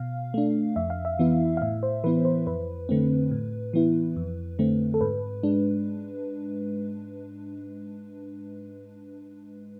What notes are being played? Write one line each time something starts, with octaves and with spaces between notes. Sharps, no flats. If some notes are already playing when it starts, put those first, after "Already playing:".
Already playing: B2 F5
A3 D4
F2 E5
F5
E5
E3 B3 E4
F5
A2 E5
C5
E3 B3 E4 B4
C5
F2 B4
D3 A3 C4
A2
E3 B3 E4
F2
D3 A3 C4
A4
G#2 B4
G#3 D4